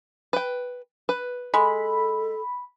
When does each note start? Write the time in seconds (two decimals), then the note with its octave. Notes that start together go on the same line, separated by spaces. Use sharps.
0.33 B4 G5
1.09 B4
1.54 G#3 A4 B5